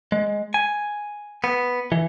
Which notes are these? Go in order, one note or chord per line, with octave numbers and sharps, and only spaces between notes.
G#3
G#5
B3
E3